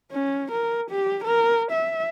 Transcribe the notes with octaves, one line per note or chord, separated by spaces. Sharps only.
C#4
A#4
G4
A#4
E5